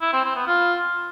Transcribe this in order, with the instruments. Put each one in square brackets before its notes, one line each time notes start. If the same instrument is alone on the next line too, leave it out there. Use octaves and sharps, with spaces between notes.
[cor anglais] E4
C4
C4
B3
F4